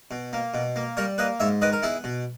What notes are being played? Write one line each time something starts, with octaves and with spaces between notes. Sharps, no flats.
B2
A#3
B2
A#3
G3 A#4 C#5
A#3 B4 D#5
G#2 C#5 E5
D#3 B4 D#5
A#4
B3 E4 G#4
B2